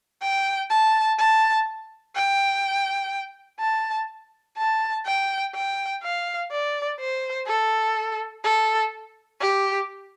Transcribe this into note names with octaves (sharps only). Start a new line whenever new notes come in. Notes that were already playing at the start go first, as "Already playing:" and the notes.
G5
A5
A5
G5
A5
A5
G5
G5
F5
D5
C5
A4
A4
G4